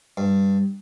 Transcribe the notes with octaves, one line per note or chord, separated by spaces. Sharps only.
G2